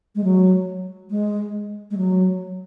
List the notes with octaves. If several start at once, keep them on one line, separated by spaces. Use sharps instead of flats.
G#3
F#3
G#3
G#3
F#3